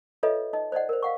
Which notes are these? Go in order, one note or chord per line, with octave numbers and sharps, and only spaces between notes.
F4 A4 B4 C#5 D#5 E5
D#4 D#5
C5 D5 D#5 F#5
A#4 C5
F5 F#5 C#6